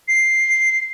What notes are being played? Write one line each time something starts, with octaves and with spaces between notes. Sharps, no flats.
C7